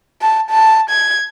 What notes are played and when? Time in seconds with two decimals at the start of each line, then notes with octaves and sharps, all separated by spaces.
0.21 A5
0.50 A5
0.90 G#6